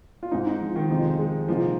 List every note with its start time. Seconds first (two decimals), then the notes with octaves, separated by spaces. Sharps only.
0.23 F4
0.32 G#2 G#3 C4 D#4
0.46 D#4
0.61 F3
0.76 D#3
0.90 F2 C3 F3 G#3
1.19 G#3
1.48 C2 A#2 F3 A#3 D#4